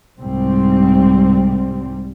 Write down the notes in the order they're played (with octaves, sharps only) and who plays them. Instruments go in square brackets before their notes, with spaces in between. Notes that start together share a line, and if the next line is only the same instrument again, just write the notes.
[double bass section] C2 G#2 G3 C4